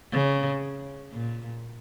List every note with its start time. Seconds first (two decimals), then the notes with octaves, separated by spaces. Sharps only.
0.12 C#3
1.12 A#2